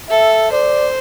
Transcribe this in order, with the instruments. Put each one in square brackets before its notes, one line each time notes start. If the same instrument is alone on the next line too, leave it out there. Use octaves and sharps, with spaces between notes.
[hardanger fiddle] A4 [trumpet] E5
[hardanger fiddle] C5 [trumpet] D5